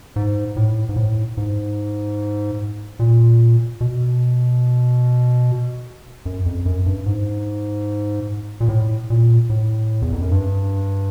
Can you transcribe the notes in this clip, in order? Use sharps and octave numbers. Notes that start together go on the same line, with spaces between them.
G#2
A2
G#2
A2
G#2
A#2
B2
F#2
F2
F#2
G2
G#2
A#2
A2
A#2
A2
E2
F2
F#2
G2